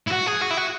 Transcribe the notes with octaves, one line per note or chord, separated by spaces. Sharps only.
E4
F#4
G#4
F#4
E4
F#4